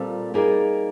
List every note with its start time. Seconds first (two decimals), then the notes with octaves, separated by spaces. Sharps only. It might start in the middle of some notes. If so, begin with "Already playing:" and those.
Already playing: A#2 G3 C4 F4 A4
0.34 G3 A#3 D#4 G#4